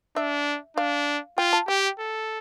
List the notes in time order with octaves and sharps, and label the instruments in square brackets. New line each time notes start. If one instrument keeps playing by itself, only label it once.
[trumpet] D4 [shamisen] E5
[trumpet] D4 [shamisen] F5
[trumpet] F4 [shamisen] G5
[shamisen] A5
[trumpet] G4 [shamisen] G5
[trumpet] A4